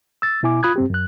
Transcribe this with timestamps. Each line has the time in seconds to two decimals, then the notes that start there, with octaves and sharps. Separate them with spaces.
0.22 E6 A6
0.43 B2 E4 G#5 D6
0.63 F4 B5 D#6 F#6 G#6
0.76 G2 C4 G4
0.90 F#2 F#6